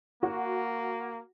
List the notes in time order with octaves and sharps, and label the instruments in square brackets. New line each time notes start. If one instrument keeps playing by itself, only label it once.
[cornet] A#3 [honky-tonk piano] F#4